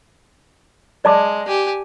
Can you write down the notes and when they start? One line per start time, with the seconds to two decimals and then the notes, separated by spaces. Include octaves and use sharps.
1.05 G#3 D5 A5 D6
1.47 G4 G#5